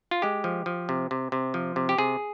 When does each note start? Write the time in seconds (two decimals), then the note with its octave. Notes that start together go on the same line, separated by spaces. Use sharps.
0.11 F4
0.22 G#3 G4
0.44 F3
0.66 F3
0.89 C3
1.11 C3
1.32 C3
1.54 F3
1.76 C3
1.89 G4
1.98 C3 G#4